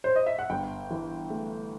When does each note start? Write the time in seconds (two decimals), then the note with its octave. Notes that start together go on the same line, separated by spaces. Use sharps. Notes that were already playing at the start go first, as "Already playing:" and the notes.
0.04 C5
0.16 D#5
0.26 E5
0.39 F#5
0.50 G1 G5
0.90 E3
1.30 A3